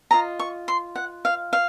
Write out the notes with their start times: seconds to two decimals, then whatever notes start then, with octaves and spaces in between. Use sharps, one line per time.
0.11 F4 A4 D#5 A#5
0.39 C#6
0.68 C6
0.96 F#5
1.25 F5
1.53 F5